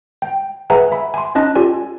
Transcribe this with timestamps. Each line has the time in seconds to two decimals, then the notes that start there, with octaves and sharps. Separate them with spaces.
0.22 G5
0.70 G#4 B4 E5 F#5 G#5 A#5
0.92 E5 B5
1.14 G#5 C6
1.35 C#4 D#4 D#5 A5 F#6
1.55 F4 G4 A4 D5 G#5